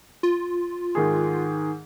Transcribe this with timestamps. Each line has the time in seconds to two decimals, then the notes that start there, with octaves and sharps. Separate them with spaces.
0.23 F4
0.95 G#2 D#3 G#4